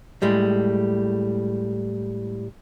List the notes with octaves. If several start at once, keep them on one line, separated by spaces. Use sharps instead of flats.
A2 G3 G#3